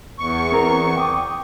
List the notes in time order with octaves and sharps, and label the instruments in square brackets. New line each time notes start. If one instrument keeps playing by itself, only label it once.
[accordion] E2 C#6
[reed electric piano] C4 A#4 A#5
G5 D6 D#6